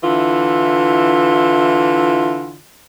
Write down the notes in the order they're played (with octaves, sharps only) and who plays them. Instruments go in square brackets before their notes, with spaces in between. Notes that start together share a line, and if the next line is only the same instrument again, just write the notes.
[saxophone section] D3 E3 E4 F4